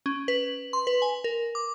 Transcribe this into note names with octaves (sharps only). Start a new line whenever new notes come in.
C#4
B4
C6
B4
G#5
A#4
D6